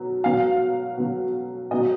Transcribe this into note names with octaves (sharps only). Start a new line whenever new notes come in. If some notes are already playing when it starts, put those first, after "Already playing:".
Already playing: B2 F#3
B2 F#3 F5
B2 F#3
B2 F#3 D#5